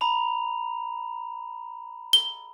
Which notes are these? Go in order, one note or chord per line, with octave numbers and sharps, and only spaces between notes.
A#5 B5 F7
G7